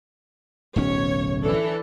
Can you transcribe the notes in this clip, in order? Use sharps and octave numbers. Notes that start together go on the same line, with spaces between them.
D1 B1 C#4 C#5
E3 D4 A4